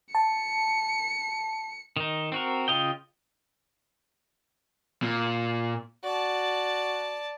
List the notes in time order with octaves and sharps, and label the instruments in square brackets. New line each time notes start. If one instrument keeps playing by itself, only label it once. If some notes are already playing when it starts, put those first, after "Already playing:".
[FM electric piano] A5 [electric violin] C#7
[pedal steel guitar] D#3 D#4
C4 F#4 A#4
C#3 F4 D#5 G5
[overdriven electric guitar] A#2
[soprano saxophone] F#4 [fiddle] D5 A5